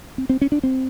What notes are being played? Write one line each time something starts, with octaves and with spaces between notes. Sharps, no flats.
C4
C4
C#4
D4
C4